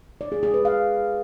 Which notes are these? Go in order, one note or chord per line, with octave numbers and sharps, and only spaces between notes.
D5
G#4
G#4
B4
F5